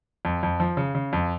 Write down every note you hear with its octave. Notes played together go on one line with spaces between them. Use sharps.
F2
F2
F3
C#3
C#3
F2